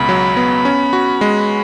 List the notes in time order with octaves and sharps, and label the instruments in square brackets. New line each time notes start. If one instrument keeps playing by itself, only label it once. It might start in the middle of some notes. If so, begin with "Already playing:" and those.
Already playing: [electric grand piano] C#2 B2 B3 [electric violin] B5
[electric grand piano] F#3
B3
C#4
F#4
G#3